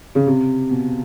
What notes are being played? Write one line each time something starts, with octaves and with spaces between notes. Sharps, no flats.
C#3
C3
B2